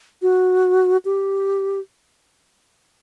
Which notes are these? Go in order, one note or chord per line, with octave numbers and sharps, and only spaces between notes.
F#4
G4